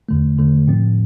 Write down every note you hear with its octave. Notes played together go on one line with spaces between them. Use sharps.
E2 D3 A3
E2 D3 A3
A2 F3 C4